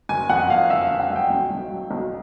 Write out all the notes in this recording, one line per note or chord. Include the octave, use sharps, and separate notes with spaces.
F#1 G#5
F2 F#5
F2 F5
F#1 E5
F#1 F5
F#5
F#1
G5
B1
B1
F#3
B1